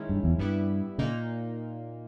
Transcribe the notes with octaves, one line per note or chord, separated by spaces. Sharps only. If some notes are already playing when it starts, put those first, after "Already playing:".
Already playing: D#3 G#3 C#4 E4
G2
E2
G2 G3 B3 E4
A#2 C#3 A#3 D#4